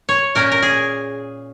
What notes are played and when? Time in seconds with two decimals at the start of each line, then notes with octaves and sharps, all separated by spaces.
0.09 C#5
0.35 A#2 A#3 C#4 A#4
0.52 A#4
0.62 G#4